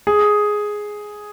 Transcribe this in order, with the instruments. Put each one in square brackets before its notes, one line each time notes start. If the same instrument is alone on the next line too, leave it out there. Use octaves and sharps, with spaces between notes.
[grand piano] G#4